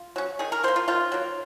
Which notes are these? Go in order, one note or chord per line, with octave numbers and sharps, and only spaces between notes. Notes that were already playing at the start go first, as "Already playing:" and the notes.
Already playing: F4
F#3 C#4
D#3 G#4
A#4
F#3 A#3 C5
F4
D#3 F4
F#3 A#3